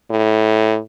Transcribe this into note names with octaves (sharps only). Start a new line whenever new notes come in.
A2